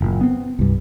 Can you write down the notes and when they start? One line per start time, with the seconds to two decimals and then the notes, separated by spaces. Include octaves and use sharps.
0.01 F#1 A#2
0.21 B3 C4
0.59 C2 G2